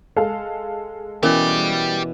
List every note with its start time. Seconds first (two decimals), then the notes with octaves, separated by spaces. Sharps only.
0.16 G#3 A4 F5
1.23 B2 E3 C#4 G4 A#4 C#5 D5